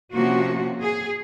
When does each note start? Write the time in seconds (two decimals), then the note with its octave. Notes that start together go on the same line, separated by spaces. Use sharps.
0.14 C3 F3 A#3 C#4 F#4
0.81 G#4